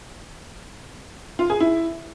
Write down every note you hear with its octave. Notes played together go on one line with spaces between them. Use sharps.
F4
G#4
E4